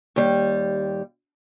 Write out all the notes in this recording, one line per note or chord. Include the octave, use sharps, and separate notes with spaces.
D#2 G3